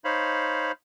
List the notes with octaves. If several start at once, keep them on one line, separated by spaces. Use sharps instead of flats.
D#4 C5 C#5 F5 B5